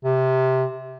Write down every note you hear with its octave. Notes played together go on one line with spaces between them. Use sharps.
C3